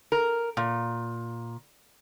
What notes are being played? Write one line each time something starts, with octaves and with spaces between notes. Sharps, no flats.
A#4
A#2